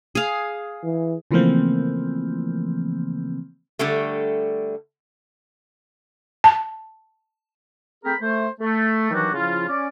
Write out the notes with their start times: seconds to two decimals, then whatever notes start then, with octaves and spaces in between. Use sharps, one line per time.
0.15 G#4 F5
0.83 E3
1.31 C#3 E3 F3 A3 A#3 C4
3.79 D3 G3 A3
6.44 A5
8.04 A3 C4 G#4 A#4 G5 B5
8.21 A3 C5
8.61 A3
9.11 D#3 E3 F#3 G3 D4 F#4
9.34 C#3 F3 E4 F4
9.69 C#4 D5